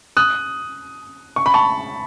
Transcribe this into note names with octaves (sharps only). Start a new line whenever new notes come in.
D#6 F#6
C#6
B5
A5 C#6